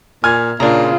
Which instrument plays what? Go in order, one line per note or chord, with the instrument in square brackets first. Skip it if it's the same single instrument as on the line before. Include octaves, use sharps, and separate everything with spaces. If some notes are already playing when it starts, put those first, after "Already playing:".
[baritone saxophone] A#2 [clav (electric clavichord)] G#5 [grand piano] F6 G#6
[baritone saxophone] A#2 [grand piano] C#3 [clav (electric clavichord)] D4 A#5 [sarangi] F4